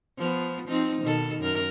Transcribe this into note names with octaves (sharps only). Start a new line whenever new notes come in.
F3 B3
F3 C4 D#4
B2 D#3 A4
F#2 A#4